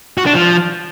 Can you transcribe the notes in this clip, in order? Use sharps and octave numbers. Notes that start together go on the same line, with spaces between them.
F#4
D4
F3